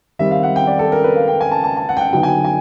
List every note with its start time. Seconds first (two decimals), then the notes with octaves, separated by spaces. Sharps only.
0.19 D#3 G3 C4 E5
0.31 F5
0.43 F#5
0.56 G5
0.67 D5
0.79 A4
0.92 A#4
1.04 B4
1.16 F5
1.28 G5
1.41 G#5
1.51 A5
1.64 A5
1.77 A5
1.89 F#5
1.97 G5
2.00 F#5
2.13 D3 F#3 B3 D#4 G5
2.23 G#5
2.28 G5
2.45 G#5